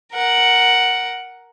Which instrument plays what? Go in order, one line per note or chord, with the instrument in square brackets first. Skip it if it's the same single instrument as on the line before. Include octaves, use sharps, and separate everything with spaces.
[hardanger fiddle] A#4 F#5